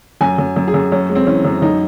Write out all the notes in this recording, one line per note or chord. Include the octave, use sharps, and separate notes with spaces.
F#2 G#5
F#2
F#2
G#4
F#2
F#2 C#4
G#3
C4
E3 C#4
F#2
F#2 D#4